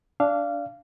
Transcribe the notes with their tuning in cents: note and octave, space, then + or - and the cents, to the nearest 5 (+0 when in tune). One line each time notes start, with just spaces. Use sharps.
D4 -15 F5 -20